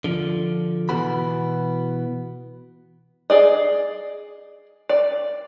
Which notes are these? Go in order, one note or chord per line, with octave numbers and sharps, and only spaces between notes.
D3 F3
B2 E3 B3 F#4 B5
G#4 D5 D#5
D5